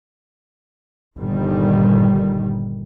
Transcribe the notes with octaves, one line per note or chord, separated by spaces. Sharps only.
G1 A#2 D#3 G3